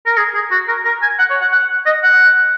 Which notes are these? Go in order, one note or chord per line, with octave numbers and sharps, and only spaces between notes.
A#4
G#4
G#4
F#4
A#4
A#4
G#5
F#5
C#5
F#5
F#5
D#5
F#5